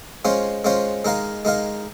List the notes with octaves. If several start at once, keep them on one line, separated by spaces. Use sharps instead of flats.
G#3 C#4 F4 C5
G#3 C#4 F4 C5
G#3 D#4 A#4 F5
G#3 D#4 A#4 F5